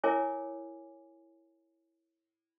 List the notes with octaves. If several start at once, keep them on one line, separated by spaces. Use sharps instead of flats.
E4 A#4 C#5 G#5 D6